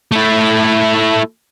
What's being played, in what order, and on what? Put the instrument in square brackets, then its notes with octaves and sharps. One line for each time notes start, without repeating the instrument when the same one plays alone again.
[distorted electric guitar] A3 E4